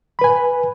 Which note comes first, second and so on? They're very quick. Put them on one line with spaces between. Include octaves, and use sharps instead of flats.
B5 B4 G#5